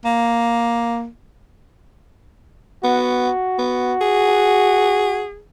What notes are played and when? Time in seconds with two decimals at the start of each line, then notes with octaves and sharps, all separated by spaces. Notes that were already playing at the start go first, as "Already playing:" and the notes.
0.05 A#3
2.84 B3 F#4
3.59 B3
4.01 G#4